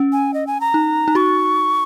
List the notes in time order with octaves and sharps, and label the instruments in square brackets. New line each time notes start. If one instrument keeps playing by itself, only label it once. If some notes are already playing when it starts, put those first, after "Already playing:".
Already playing: [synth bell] C#4
[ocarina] G#5
D#5
G#5
A#5
[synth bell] D#4
D#4
[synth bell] F#4 [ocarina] C#6